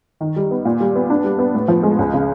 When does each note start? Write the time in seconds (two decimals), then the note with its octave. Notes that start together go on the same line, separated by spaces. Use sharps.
0.21 D#3
0.36 G3
0.51 B3
0.65 A#2
0.80 G3
0.95 B3
1.10 D4
1.24 G3
1.39 B3
1.55 A2
1.68 F3
1.83 G#3
1.99 C#2
2.13 C#3